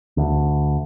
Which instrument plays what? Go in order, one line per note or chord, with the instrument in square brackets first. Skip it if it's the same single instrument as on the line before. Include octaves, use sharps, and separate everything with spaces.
[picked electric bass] D2